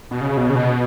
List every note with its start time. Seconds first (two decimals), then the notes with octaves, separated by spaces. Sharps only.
0.11 B2
0.21 C#3
0.37 B2
0.50 C#3
0.55 B2